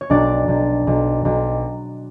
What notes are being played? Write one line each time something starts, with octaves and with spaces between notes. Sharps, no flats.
C#5
B1 D4 D5
B1
B1
B1